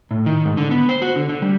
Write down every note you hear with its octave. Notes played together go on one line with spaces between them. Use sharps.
A2
D#3
G#2
D3
B3
C5
F#4
D3
D3
G3